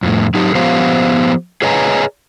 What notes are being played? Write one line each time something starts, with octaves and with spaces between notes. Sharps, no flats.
F2 A2
F#3 D#4 G4
F3 B3 G4 C5 F5
G#4 B4 C#5 D#5 G#5 A#5